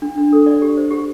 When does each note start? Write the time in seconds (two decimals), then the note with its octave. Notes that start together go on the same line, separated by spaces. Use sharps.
0.02 D4
0.18 D4
0.32 A4
0.46 D5
0.62 G4
0.77 C5
0.91 G4